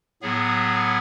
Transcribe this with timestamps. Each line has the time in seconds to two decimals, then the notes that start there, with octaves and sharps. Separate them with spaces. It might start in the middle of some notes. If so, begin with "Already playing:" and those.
0.22 A2 F#3 B3 G#4